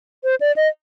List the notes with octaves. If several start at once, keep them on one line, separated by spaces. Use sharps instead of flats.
C5
D5
D#5